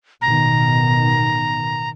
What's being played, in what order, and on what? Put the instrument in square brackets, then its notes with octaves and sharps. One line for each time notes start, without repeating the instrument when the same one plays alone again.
[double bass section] A1 B2 D#3 [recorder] A#5